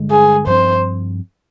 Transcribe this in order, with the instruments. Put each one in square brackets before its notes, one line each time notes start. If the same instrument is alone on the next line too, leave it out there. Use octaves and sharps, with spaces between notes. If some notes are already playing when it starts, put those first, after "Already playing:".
Already playing: [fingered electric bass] G2 D3 G#3
[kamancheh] G#4
[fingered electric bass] G2 F3 C4 [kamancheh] C5